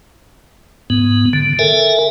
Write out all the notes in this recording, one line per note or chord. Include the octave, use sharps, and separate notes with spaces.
G#2 B3
D3
A4 A#4 E5 G#5